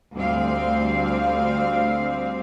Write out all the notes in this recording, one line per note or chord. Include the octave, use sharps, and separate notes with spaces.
D2 G3 C4 F5